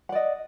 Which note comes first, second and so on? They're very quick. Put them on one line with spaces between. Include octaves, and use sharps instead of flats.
F#5 D5 D#5